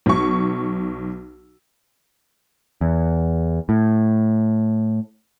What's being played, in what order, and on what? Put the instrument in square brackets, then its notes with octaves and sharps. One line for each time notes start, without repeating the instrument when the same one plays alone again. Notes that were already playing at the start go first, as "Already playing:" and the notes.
[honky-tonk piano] B1 C#6
[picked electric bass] E2
A2